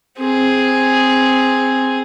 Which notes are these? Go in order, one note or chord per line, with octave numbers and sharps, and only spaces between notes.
C4 G#4